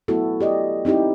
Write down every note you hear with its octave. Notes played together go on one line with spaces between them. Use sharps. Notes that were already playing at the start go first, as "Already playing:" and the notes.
F#3 A3 B3 E4 F#4 A4
G4 D5 D#5
C4 D#4 E4 G4